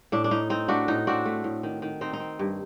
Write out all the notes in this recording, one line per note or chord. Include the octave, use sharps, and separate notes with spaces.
A2 D4
D4
A2 D#4
C4 D#4
A3 D4 F#4
A2 D#4
C4 D4 F#4
A3
A2
D#3
D#3
C4 D#4
D#4
C4
G2